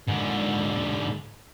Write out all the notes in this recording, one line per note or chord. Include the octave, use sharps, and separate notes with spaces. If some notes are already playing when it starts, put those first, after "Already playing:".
G#2 D3